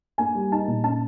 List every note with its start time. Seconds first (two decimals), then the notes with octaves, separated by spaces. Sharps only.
0.18 A#3 G#5
0.35 G3
0.52 D#4 A5
0.68 A#2
0.84 C#4 A5